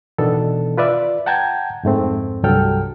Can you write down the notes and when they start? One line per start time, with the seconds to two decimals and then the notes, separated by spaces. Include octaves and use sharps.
0.18 B2 D#3 E3 B3 D4 A4
0.77 F4 B4 D5 E5
1.26 F#5 G5 A5 A#5 G6 G#6
1.83 F2 G#2 A3 C4
2.43 C2 G2 F#3 A4 G5 F6